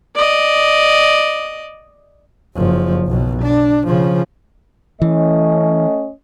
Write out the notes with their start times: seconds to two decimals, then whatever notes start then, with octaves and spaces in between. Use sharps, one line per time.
0.16 D5 D#5
2.56 F#1 F3
3.08 B1 B2
3.42 D4
3.87 C#3 F3
5.02 E3 A3 C#4 D#5